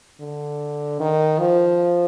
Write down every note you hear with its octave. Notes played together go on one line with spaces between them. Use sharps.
D3
D#3
F3